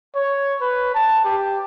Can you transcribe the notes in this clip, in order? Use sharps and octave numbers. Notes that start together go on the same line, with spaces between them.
C#5
B4
A5
G4